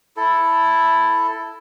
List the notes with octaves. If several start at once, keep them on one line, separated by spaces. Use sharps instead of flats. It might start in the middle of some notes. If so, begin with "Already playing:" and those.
E4 A4